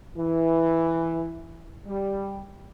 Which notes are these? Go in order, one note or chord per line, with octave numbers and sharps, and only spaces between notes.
E3
G3